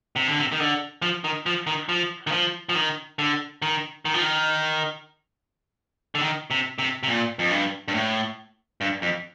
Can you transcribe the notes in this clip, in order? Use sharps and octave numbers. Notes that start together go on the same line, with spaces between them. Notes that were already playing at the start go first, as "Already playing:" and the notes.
C3
D3
C3
D#3
D3
F3
D#3
F3
D#3
F3
D#3
F3
F3
D#3
D3
D#3
D#3
F3
D#3
D3
D#3
C3
C3
C3
A#2
F2
G2
G2
A2
G2
F2